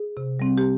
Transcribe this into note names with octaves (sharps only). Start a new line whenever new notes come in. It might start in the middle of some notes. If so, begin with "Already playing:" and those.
Already playing: G#4
C3
G3 C4
G4